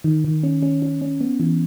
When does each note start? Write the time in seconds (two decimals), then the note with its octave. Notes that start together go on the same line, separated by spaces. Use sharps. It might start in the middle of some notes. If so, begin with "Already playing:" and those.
0.04 D#3
0.24 D#3
0.43 C#4
0.62 C#4
0.82 C#4
1.02 C#4
1.21 B3
1.40 E3